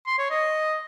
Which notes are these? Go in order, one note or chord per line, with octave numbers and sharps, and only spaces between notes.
C6
C#5
D#5